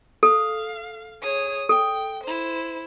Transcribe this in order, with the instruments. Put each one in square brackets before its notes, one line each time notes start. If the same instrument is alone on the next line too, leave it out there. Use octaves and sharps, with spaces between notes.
[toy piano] A4 [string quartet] F5
[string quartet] G#4 C#5 D#6
[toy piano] A4 [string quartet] G5
[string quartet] E4 C5